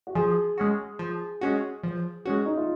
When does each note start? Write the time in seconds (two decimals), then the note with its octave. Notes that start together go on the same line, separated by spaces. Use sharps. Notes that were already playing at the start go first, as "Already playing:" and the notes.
0.07 F#4
0.15 F3 G#4
0.58 G#3 C#4 F#4
0.99 F3
1.41 G#3 C#4 F#4
1.83 F3
2.26 G#3 C#4 F#4
2.46 D#4
2.57 F4